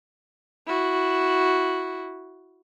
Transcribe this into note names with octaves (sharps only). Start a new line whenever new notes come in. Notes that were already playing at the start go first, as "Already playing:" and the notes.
E4 F#4